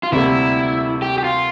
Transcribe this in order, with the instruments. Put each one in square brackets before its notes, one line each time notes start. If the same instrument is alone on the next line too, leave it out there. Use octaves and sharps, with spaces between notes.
[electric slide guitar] F4
[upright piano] D2 C3 G3 A#3 [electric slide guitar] E4
[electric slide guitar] G4
G4
F4